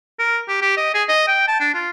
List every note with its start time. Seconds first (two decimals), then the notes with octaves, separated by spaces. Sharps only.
0.19 A#4
0.48 G4
0.62 G4
0.77 D#5
0.94 G#4
1.09 D#5
1.27 G5
1.48 A5
1.60 D4
1.74 F4